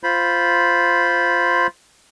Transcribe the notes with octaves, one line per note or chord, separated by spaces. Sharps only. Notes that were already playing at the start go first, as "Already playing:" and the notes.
F4 C5 B5